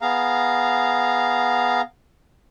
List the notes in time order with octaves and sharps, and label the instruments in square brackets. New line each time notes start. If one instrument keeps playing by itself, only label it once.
[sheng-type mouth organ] B3 G#4 F5 A#5